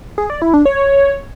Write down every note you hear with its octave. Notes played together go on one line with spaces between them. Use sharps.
G#4
D5
E4
D4
C#5